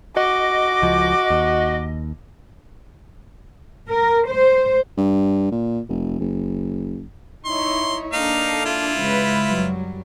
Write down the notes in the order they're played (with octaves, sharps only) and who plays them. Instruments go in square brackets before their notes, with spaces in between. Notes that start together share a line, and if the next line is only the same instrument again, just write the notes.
[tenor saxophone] F#4 [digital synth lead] D#5 [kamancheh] D6
[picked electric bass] C#2 F3
D#2
[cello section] A#4
C5
[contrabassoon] G2
A#2
F1
F#1
[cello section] D#4 E4 C#5 [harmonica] C6
[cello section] A#3 D4 A4 [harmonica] D#4 F5
[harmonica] E4 F4
[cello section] C#3 G#3 B4
F#2 F#3 G3